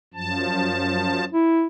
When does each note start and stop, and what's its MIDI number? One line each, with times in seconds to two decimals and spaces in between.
0.14 1.25 42
0.14 1.25 53
0.14 1.25 81
1.33 1.66 64